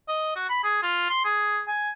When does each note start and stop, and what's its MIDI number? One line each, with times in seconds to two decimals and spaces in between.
0.08 0.35 75
0.36 0.46 66
0.49 0.60 83
0.63 0.79 68
0.83 1.08 65
1.10 1.25 84
1.25 1.61 68
1.68 1.90 80